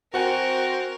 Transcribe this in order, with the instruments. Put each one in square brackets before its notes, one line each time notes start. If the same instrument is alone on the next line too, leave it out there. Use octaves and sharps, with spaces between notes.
[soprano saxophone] C4 [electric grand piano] F#4 F#5 G#5 [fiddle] A#4